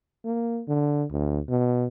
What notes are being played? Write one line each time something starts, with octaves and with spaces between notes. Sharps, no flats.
A#3
D3
D2
B2